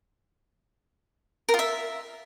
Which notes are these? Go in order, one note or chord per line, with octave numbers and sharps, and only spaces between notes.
A#4
F4
E5